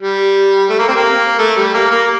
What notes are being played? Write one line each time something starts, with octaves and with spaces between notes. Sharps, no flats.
G3
A3
A#3
C4
A#3
A3
G3
A#3
A#3